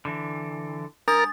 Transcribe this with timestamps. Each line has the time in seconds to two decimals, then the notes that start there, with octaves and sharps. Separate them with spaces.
0.05 D3 E3
1.08 D4 A#4 D#6 A6